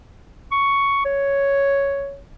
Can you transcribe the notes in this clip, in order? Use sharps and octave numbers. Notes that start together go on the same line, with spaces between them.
C#6
C#5